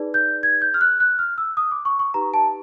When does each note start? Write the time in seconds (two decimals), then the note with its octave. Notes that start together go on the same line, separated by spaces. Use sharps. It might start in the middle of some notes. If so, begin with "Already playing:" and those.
Already playing: D#4 G#4 B4 D5
0.14 G6
0.43 G#6
0.62 G6
0.74 F6
0.81 F#6
1.00 F#6
1.19 F6
1.38 E6
1.57 D#6
1.71 D6
1.85 C#6
1.99 C#6
2.14 D#4 G4 B4 A#5
2.34 A5